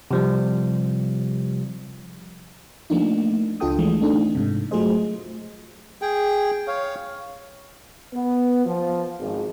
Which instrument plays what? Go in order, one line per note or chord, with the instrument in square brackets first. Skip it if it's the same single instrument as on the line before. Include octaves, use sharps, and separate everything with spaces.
[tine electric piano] C3 F3 G3
[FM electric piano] F3 A3 A#3 D4 D#4
C#2 D4 F4 A4 G5 D#6
E3 F3 G#3 A3
A3 C4 D4 D#4 A4
G#2 C3
F#3 A3 F4 G#4 C5 D#5
[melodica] G#4 G5
C#5 F5
[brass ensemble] B3
F3
G#1